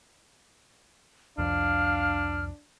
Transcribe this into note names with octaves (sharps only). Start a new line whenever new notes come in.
C2 F2 D4 F5 F6